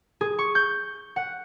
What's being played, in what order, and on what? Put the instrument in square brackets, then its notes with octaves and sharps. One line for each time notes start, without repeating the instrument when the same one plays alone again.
[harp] G#4
C#6
G6
F#5